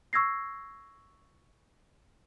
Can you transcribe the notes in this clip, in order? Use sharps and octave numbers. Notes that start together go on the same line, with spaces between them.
C#6 E6 G#6 A#6 C7